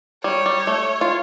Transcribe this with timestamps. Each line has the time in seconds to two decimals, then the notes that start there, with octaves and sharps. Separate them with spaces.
0.24 G3 C#5
0.46 G3
0.67 A3
1.01 F4